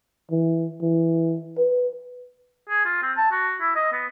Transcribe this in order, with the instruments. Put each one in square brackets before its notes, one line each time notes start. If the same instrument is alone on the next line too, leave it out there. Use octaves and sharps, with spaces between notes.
[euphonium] E3
E3
B4
[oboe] G#4
F4
C4
A5
F#4
E4
D#5
B3